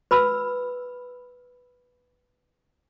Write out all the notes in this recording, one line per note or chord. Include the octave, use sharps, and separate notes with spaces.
B4 B5 E6